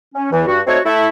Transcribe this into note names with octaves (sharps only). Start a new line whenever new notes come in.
C#4
E2 E3
G2 F#4
A3 C4 D#4 F#4 C#5
A3 E4